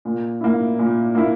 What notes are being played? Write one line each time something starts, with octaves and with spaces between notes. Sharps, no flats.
A#2
A#3 E4
A#2
A#3 E4